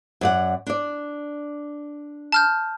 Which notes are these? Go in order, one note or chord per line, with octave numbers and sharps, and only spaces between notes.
F#2 D5 F#5
D4 D5
A5 F6 G6